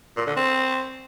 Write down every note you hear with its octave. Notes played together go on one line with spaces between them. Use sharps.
A#2
D3
C4